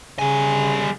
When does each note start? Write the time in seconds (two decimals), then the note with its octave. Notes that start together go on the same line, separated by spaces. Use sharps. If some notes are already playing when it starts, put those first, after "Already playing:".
0.19 C#3 G3 G#5